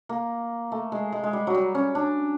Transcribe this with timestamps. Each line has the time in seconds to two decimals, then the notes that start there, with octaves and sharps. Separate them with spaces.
0.09 A#3
0.72 A3
0.92 G#3
1.12 G#3
1.24 G#3
1.33 G3
1.47 F#3
1.54 G3
1.75 C#4
1.95 D4